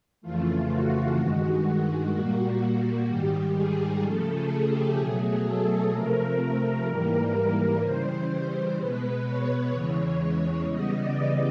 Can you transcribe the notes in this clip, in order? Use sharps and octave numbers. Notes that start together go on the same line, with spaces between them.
F2 C#3 E3 A3 F4
F#4
G2 D#3 G#3
A#2 G3 A#3
G#2 D#3 G3 G4
G#4
C#3 F3 A3 A4
G#4
G4
B2 F#3 A3 G#4
A4
C3 F3 A3 A#4
G#2 E3 G3 A#3
C#3 E3 G3 C5
C5
B2 G#3 B3 B4
C#5
E2 C#3 E3 G#3
C#3 E3 G3 B3 D#5
D5